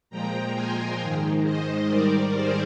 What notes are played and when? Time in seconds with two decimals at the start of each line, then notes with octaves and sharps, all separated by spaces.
0.10 A#2 F3 G#3 G5 A#5
0.55 G#5 C6
1.01 G#2 D#3 G#3
1.44 C5 D#5
1.88 G#2 D#3 G3 A#4 D5
2.34 G#4 C5